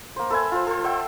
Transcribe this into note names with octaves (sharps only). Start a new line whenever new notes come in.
A#3 C5
A4 B4 E5 G#5
F4 C5
A4 C5
C5 E5 F#5 G5